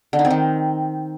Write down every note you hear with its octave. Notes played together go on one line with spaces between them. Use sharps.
D3
D#4
C4
D#3